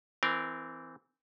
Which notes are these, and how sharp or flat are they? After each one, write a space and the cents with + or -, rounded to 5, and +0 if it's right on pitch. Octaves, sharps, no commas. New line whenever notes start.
E3 +0 C4 -20 A#4 +0